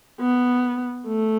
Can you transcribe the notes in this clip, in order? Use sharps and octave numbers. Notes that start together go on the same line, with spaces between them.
B3
A3